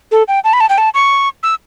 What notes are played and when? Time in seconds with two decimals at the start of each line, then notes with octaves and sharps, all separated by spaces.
0.12 A4
0.28 G5
0.44 A5
0.53 B5
0.60 A5
0.69 G5
0.78 A5
0.94 C#6
1.43 E6